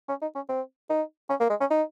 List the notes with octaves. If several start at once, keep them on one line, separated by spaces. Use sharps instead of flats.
C#4
D#4
C#4
C4
D#4
C#4
A#3
G#3
C#4
D#4